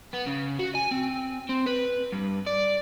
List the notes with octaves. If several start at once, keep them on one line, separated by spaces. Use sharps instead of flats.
B3
C#3
F#4
G#5
C4
C4
B4
G2
D5